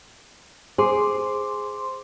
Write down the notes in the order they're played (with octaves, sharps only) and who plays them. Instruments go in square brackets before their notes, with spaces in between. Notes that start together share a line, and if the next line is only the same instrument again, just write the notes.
[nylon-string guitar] G#4 [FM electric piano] C5 C6 D6